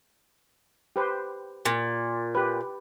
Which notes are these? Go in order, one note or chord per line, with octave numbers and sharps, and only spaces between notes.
G4 B4 C5
A#2
G4 B4